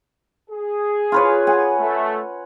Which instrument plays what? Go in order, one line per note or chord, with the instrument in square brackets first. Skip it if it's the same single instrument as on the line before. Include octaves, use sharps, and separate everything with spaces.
[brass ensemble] G#4
[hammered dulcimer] F4 B4 C#5
F#5 G#5
[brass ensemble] A3